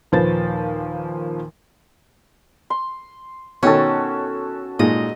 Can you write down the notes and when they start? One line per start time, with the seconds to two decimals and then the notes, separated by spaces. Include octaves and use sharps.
0.12 D#2 A#2 F3 B4 C5 A6
2.70 C6
3.63 B2 D#3 C#4 F#4 A4
4.79 A#2 G#3 D#4 D#5